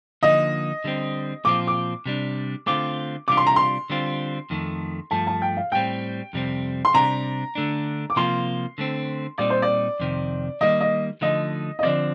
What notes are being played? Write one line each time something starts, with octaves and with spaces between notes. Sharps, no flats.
D3 F3 A#3 D#4 D#5
D3 G3 C4
A#2 F3 C4 F4 D6
D6
C3 G3 D4
D3 A3 C4 F4 D6
C3 G3 D4 F4 D6
C6
A#5
C6
D3 G3 C4 F4
F2 D#3 A3
G2 F3 A3 A5
A5
G5
F5
A2 G3 C4 G5
F2 C3 G3 C4
C6
C3 G3 D4 A#5
D3 A3 D4
D6
C3 F3 A#3 F4 C6
D3 A3 C4
A#2 G3 C4 D#4 D5
C5
D5
F2 C3 D#3
D#3 G3 A#3 D#5
D#5
D3 F3 A3 D#4 D#5
D#5
D3 F3 C4 D5